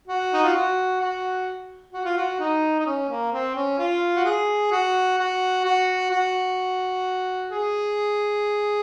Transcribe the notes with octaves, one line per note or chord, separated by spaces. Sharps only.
F#4
D#4
F4
F#4
F#4
F#4
F4
F#4
D#4
D#4
C#4
A#3
C4
C#4
F4
F#4
G#4
F#4
F#4
F#4
F#4
G#4